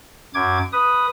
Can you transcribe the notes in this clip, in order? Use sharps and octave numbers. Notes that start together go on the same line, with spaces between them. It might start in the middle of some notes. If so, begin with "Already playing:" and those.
F#2 D6 G#6
B4 D#6